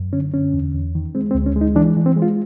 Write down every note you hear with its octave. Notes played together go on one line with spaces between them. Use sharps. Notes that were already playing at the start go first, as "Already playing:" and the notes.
Already playing: F#2
D3 C#4
D3 C#4
E2
E2
D#3
G#3 C4
C4
D2
C#4
G#3
D#4
E3 D4
E3
C4
G#3
F4